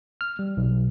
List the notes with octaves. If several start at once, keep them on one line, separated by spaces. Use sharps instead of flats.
F6
G3
B1